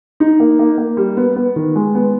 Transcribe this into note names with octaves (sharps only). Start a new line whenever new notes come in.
D#4
A#3
A#3
A#3
G3
B3
B3
D#3
G#3
B3